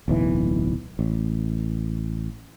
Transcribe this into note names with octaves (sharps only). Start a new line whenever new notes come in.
D1 B1 E3
A1